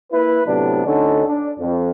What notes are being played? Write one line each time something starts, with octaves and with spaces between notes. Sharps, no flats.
A#3 E4 B4
A2 C3 F#3 B3 D4
D2 D3 C#4 D#4 A4
D4
F2